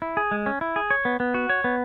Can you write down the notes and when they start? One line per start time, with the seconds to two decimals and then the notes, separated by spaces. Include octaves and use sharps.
0.02 E4
0.17 G#4
0.31 G#3
0.46 C#4
0.61 E4
0.76 G#4
0.91 C#5
1.05 B3
1.20 B3
1.34 F#4
1.49 C#5
1.64 B3